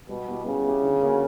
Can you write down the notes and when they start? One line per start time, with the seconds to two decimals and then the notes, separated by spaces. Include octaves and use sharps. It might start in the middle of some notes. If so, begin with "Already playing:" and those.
0.09 B2 G3
0.28 B3 E4 G4
0.45 C#3 G3
0.64 B3 E4 G4
0.83 D3
1.01 A#3 C#4 F#4